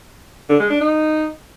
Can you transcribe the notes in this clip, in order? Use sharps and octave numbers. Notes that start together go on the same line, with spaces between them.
D3
G#3
D4
D#4